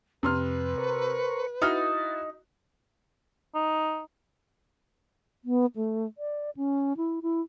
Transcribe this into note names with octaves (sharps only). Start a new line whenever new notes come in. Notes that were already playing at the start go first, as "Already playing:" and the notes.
F2 C3 B4 C6 F6
A#4 C5 C#6
D#4 E4 F#4 F6 A6
D#4
B3
A3
D5
C#4
E4
E4